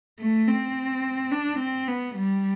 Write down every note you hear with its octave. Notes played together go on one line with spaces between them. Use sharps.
A3
C4
D4
C4
B3
G3